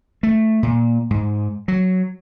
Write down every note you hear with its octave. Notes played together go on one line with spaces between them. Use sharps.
A3
A#2
G#2
F#3